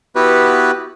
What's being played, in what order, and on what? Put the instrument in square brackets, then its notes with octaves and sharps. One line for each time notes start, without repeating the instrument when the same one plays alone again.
[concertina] B3 E4 F#4 G4 B4